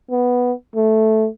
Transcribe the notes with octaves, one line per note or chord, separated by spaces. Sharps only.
B3
A3